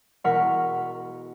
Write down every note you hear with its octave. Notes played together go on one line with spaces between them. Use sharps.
E1 A#4 F#5 C#6 F6 B6